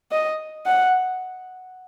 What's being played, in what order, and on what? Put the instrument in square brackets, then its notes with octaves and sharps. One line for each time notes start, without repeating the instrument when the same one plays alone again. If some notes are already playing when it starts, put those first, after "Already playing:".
[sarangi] D#5
F#5